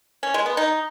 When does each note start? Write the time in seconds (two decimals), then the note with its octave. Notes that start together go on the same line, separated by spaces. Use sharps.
0.23 C#4
0.34 G#3
0.46 B3
0.57 D#4